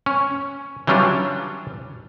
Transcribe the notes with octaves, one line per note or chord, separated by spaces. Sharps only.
C#4
E3 F#3 G3 C#4 D4 F4